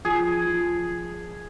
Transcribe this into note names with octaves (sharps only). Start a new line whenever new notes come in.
F3 G#4
F3